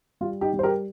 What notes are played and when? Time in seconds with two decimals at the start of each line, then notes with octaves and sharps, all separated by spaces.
0.21 G3 F4
0.41 D#4 G4
0.53 G3
0.59 C5
0.63 G4 A#4